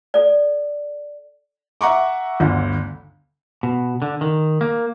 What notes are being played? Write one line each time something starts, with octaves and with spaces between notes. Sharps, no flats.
A4 D5
E5 F#5 A#5 C#6 D6
G1 D2 D3
B2
D3
D#3
A#3